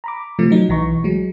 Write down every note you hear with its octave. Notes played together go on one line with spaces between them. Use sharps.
A#5 B5 D6
C3 F3 A3
F#3 D#4
B1 E3 A#5 C#6
F#3 G#3